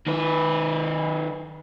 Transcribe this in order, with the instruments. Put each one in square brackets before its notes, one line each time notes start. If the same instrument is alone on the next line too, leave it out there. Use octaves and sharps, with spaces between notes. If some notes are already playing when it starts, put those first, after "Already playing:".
[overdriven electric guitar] D#3 B4